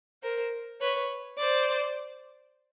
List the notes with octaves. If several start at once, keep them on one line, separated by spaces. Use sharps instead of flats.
A#4 C5
B4 C#5
C5 D5